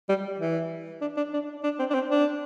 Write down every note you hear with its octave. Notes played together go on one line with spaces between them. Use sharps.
G3
E3
D4
D4
D4
D4
C4
D4
C4
D4